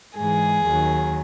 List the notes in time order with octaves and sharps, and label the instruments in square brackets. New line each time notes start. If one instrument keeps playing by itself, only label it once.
[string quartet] G#2 E3 G#3 G#4
D#2 D#3 F#3